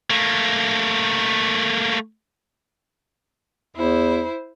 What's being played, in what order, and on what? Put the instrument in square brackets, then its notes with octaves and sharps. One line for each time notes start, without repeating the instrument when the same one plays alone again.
[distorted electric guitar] A3 A#3
[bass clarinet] E2 [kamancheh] E4 C5